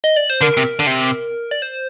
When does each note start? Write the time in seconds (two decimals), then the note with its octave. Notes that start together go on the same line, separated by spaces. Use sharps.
0.04 D#5
0.16 D5
0.30 C5
0.41 D3 A#4
0.57 C3
0.79 D3
0.87 C3
1.51 D5
1.62 C5